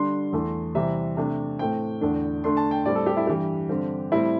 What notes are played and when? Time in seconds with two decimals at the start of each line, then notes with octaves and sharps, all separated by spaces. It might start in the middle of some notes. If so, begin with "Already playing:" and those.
Already playing: D3 G3 D4 C6
0.33 E2 E3 A3
0.75 C3 E3 G3 C4 E5
1.17 C3 A3 D4
1.59 A2 A3 C4 G5
2.01 E2 D3 A3 D4
2.44 D3 A3 D4 C6
2.57 A5
2.71 G5
2.85 A2 G3 C4 D5
2.95 A4
3.06 G4
3.17 E4
3.27 G2 E3 G3 G4
3.69 G2 D3 C4
4.12 A2 G3 C4 E4